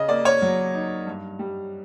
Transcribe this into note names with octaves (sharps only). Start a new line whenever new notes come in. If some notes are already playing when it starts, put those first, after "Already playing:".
Already playing: C#3 D#5
A#3 D5
C#5
F#3
D#4
G2
G3